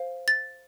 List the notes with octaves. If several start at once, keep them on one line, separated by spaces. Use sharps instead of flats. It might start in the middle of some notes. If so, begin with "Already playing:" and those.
Already playing: C5 F5
A6